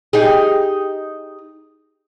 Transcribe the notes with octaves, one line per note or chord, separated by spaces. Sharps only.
D#4 G4 G#4